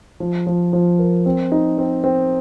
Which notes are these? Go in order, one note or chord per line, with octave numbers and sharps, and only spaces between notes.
F3
F3
F3
A#4
C4
D#4
C4
C4